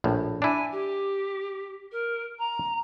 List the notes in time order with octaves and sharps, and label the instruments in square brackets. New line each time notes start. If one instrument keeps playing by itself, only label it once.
[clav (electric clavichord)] A#1 A2
[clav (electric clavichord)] D4 E4 [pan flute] G#5
[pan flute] G4
A#4
A#5